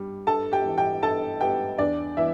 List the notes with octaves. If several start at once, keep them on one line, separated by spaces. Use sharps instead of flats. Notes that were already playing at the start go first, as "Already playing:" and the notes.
Already playing: G2 G3
G2 A4 A5
G4 G5
E3
G4 G5
G2 A4 A5
B3 G4 G5
E2 D4 D5
E3 E4 E5